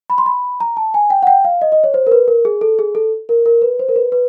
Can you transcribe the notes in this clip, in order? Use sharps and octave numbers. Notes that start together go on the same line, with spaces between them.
B5
C6
B5
A#5
A5
G#5
G5
F#5
G5
F5
D#5
D#5
C#5
C5
A#4
B4
A#4
G#4
A4
G#4
A4
A#4
A#4
B4
C5
A#4
B4
B4